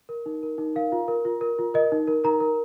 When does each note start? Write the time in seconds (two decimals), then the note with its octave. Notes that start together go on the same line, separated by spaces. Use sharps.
0.09 A#4
0.26 D#4
0.43 A#4
0.58 D#4
0.75 A#4 F5
0.92 F4
1.08 A#4
1.25 F4
1.41 A#4
1.59 F4
1.74 A#4 D#5
1.92 D#4
2.07 A#4
2.24 D#4 A#4 A#5
2.40 A#4